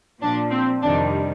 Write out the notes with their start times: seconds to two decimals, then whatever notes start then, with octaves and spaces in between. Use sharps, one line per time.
0.21 A#2 F3 D4
0.51 C4
0.82 F2 C3 D#3 G3 D4